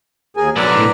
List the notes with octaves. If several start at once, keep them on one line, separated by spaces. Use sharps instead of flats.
D#2 G#4 A#4 G#5
B1 D3 F#3 A#4 B4 D5
A2